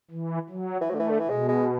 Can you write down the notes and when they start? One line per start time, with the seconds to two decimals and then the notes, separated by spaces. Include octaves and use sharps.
0.11 E3
0.50 F#3
0.81 E3
0.90 F#3 A3
0.95 D3
1.00 E3
1.09 D3
1.19 E3
1.29 B2 G#3
1.48 G#3